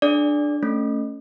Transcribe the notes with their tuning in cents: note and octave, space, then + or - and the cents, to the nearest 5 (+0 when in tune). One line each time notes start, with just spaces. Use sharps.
D4 +10 G#4 +40 D5 -10
A3 +10 C#4 +0